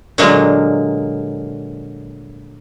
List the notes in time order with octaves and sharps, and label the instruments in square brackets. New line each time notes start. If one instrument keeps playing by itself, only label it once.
[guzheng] A#2 D3 F#3 G#3 A#3